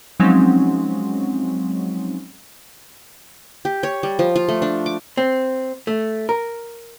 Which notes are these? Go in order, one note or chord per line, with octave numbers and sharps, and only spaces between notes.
F3 F#3 G#3 C4 C#4 D#4
G4
C#5
G3
F3
F4
A3
D4
D6
C4
A3
A#4